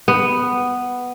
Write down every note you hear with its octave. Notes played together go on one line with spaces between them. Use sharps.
B3